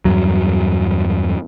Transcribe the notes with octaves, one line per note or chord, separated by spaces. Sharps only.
E2 G2 F#3